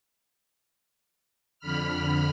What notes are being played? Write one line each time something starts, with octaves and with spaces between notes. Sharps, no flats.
F2 D3 B5 F6